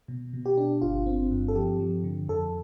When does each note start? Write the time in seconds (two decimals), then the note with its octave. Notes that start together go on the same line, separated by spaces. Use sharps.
0.08 B2
0.33 B2
0.46 G4
0.57 D4
0.82 G1 F4
1.06 C4
1.31 G2
1.48 A4
1.55 F3 G4
1.80 F3
2.04 D3
2.28 F2 A4